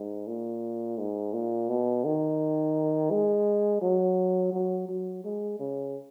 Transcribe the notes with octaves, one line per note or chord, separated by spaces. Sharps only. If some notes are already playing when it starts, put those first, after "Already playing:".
Already playing: G#2
A#2
G#2
A#2
B2
D#3
G#3
F#3
F#3
F#3
G#3
C#3